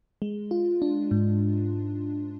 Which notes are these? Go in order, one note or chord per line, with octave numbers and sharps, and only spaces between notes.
G#3
F4
D4
G#2